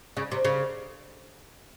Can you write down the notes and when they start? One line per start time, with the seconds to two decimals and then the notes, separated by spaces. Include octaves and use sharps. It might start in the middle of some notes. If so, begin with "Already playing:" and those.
0.17 C#3
0.32 C3
0.45 C#3